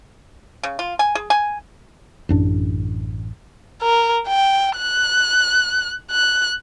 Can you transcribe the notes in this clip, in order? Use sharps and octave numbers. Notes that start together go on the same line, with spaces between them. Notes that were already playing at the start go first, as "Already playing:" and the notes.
C#3
F4
G#5
G#4
G#5
A1 F#2 D4
A#4
G5
F#6
F#6